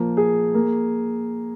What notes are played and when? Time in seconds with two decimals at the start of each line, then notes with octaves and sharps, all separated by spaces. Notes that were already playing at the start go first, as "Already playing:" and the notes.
Already playing: A#2 F3 A#3
0.17 G#4
0.54 A#3